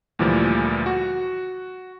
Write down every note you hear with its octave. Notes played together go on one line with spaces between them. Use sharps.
D2 A#2 E3 F3 G3
F#4